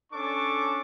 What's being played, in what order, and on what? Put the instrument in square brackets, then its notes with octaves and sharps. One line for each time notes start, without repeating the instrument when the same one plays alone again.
[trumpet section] C#4 D4 A4 C#6 D6